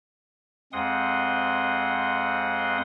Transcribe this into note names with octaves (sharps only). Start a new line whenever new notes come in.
F2 G#3 C4 F#5 C6 D#6